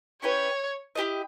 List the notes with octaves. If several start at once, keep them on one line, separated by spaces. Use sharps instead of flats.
C#4 E4 G4 B4 C#5
E4 G4 A#4 D#5